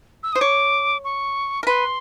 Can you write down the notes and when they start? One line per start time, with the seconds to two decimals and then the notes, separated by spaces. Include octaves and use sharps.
0.23 E6
0.32 C5 D#6
0.41 C#5 D6
1.04 C#6
1.63 A#4
1.66 B4 C6